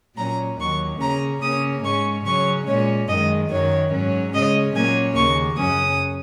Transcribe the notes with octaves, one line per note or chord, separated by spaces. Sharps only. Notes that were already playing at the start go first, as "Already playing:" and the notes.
A#2 F#3 C#4 A#5
D#2 D#3 F#3 C#6
C#3 A#3 C#4 A#5
C#3 A#3 C#4 D#6
G#2 G#3 C#4 C#6
C#3 F#3 C#4 C#6
A#2 G#3 C#4 C#5
F#2 D#3 G#3 D#5
F#2 D#3 F#3 C#5
G#2 F#3 C#4
C#3 G#3 C#4 D#5
A#2 F#3 A#3 C#4 G#5
D#2 C#3 A#3 C#6
F#2 C#3 F#3 C#4 D#6